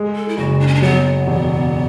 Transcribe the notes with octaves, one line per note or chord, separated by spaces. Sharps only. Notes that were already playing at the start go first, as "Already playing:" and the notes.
Already playing: G#3
A4
E4
F#1 F#4
D4
C#4
D4
F#3 B3
E1